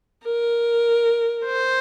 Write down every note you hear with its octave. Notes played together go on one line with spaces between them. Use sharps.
A#4
C5